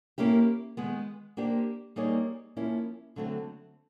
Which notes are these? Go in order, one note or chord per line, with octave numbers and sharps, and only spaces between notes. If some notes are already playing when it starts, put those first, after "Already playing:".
A#3 C#4 E4 G4
D#3 G#3 B3
A#3 D4 G4 C5
G3 A#3 D#4 G#4 C#5
F3 A#3 C#4 E4
D3 F#3 A3 C4